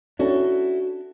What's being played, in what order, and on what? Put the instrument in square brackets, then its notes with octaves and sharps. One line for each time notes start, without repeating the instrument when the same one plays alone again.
[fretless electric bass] C#4 D4 [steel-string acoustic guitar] E4 F#4 A4